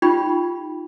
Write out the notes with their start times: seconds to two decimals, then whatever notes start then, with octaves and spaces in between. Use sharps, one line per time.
0.02 D#4 F4 G4 G5 B5